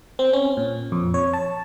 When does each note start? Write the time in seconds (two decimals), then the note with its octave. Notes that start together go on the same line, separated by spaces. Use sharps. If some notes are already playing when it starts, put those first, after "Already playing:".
0.19 C4
0.33 C#4
0.57 A#2
0.92 F2
1.14 C#5
1.33 A5